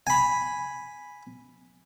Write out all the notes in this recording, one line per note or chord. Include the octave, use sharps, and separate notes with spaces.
G#5 B5